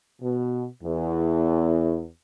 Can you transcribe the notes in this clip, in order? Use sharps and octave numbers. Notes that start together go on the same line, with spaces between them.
B2
E2